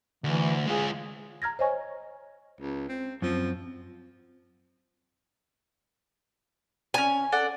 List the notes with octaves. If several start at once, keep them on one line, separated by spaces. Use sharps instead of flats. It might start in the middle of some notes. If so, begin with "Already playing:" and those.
D2 E3
G#3 F4 G#4
A#5 F6 G#6 A#6
C5 C#5 D#5 G#5 C#6
C#2
C4
F#2 F3 C4
B3 C#4 G#5
A4 D5 F#5